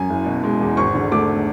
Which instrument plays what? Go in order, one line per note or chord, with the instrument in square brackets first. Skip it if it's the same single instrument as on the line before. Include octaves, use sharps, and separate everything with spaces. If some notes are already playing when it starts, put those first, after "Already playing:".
Already playing: [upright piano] F#2 G#5
F#1
B2
G#3
E2
G#1 C#6
D3
A3 D6